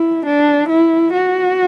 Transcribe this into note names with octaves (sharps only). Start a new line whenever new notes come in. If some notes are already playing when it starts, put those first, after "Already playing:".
Already playing: E4
D4
E4
F#4